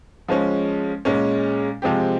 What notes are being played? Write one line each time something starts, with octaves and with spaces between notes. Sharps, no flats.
F3 G#3 C#4
A#2 G#3 C#4
C3 F3 G#3 C4 G4